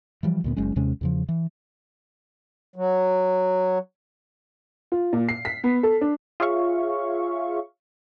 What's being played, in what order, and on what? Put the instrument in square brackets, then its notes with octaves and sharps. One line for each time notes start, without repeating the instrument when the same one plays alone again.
[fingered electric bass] E3 F3 G3
D2 A#2 B3
F#1 F#3 G#3 C#4
D#2 C3 G#3 C#4
E2 C#3 F3
E3
[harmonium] F#3
[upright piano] F4
A#2
C7
B6
B3
A4
D4
[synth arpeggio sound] F4 G#4 C#5 E5 F5 C#6